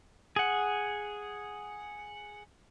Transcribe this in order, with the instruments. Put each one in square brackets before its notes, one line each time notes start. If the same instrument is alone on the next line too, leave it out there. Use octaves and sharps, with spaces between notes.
[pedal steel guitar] G#4 F#5